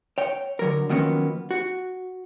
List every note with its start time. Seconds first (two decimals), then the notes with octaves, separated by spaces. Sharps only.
0.18 C#5 G5
0.59 D3 F#3 A#4
0.89 D#3 F3 F#3 A#3 B3 C#4
1.51 F#4